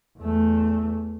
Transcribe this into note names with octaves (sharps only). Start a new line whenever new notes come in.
E2 A3